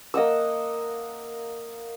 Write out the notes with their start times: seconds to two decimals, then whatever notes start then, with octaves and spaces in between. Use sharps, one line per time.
0.14 A#3 D#5 F#5 E6